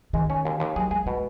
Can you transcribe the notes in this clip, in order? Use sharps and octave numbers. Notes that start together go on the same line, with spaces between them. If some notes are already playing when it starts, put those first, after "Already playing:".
D#3 G#3
C#4
D#2
D#2
F#3 G#4
G#3 G#4
B2 G#3